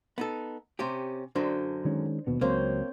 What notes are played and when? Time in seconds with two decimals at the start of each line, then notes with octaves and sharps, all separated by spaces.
0.18 B3 D#4 A4
0.79 C3 C#4 G4
1.35 F#2 D3 F#3 D4 C5
1.85 D#3 G#3 C#4
2.27 D#2 B2 B3
2.41 C#2 F#3 A#3 C4 C5 C#5